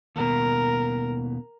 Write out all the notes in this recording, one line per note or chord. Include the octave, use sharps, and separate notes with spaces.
D#2 B2 A#4